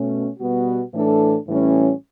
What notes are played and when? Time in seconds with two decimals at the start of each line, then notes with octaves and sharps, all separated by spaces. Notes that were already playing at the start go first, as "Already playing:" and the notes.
Already playing: B2 A3 C#4
0.39 B2 G3 B3 F#4
0.94 A2 E3 A3 D4 A4
1.48 A2 E3 G3 C#4